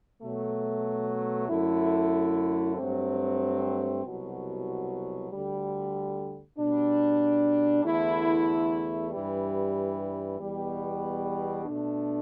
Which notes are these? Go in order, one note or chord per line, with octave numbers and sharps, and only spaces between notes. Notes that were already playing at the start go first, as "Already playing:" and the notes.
B2 F#3 A3
F#2 D3 A3 E4
G2 F#3 A3 C4
C2 B2 F#3
D2 D3 G3
B2 G3 D4
E2 D3 A3 E4
G2 E3 G3
E2 B2 G3
B2 A3 D4